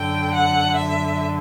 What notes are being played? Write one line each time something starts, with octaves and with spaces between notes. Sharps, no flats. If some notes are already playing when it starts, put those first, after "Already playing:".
Already playing: F#2 D3 G5
F#5
E5